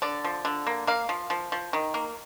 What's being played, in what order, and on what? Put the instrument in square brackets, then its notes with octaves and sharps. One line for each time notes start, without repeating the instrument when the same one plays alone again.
[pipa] D3 D5
F3
D3
A#3
A#3 F5
F3
F3
F3
D#3
A#3